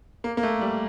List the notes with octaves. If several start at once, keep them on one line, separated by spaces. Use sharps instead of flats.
A#3
A#3
A3
G3